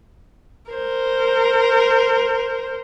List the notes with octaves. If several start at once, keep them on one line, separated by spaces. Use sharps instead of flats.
A#4 C5